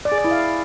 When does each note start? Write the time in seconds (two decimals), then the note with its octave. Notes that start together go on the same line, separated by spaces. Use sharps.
0.05 D5
0.12 G#4
0.18 D5
0.25 E4
0.31 F5